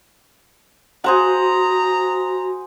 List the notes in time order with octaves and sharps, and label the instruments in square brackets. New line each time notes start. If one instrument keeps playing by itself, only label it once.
[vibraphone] F#4 [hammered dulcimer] G#4 C5 F#5 [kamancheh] A#5